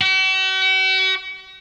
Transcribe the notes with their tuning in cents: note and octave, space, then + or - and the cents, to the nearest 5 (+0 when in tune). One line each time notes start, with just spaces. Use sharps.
F#4 +45